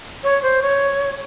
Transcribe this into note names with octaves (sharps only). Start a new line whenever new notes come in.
C#5
C5
C#5